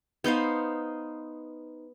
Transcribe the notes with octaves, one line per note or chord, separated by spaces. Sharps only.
B3 D#4 C5 F5